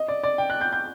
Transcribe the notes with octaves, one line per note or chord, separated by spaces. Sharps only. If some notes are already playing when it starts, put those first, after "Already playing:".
Already playing: D#5
D5
D5
G5
F#6
G6
G6